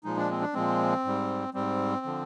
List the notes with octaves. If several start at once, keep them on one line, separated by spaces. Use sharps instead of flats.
A#2 F3 G#3 D#4
D4
C4
D4
A#2 F3 G#3 C4
G#2 G3
G#2 G3 C4
D3 F3